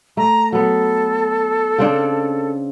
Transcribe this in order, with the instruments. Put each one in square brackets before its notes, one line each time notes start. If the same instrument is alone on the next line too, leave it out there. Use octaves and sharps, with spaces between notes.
[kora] A3 [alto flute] A#5
[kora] F#3 B3 [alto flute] A4
[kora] C#3 C4 D4